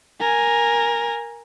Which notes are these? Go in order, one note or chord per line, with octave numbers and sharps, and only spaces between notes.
A#4 G#5